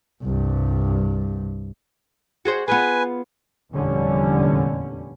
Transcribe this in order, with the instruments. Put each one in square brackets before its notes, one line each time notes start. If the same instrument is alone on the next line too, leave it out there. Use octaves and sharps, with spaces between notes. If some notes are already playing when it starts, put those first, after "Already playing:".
[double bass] C2 G2
[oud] F#4 G#4 C5
[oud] B3 F4 G#4 [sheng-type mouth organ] B4 G#5
[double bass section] F1 E2 A#2 D3 G3 C#4